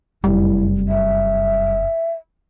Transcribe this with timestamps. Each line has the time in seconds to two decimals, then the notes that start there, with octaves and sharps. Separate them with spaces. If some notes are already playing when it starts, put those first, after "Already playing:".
0.24 F1 F#2 G3 E4
0.88 E5